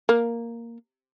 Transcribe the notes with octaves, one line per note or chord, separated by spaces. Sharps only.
A#3